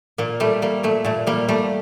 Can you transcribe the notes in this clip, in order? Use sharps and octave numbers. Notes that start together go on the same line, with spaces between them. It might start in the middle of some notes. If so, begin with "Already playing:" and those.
A#2 A#3
G3 A3
G3 A#3
A#2 A3
A#2 A3
G3 A#3
G3 A3